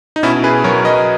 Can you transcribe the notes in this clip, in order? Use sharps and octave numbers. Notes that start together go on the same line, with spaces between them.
D#4
B2 C#4 E4
G#4 B4
F#3 A#4 C#5
B4 D#5